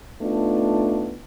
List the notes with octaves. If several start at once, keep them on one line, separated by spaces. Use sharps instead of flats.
A3 B3 D4 D#4 F4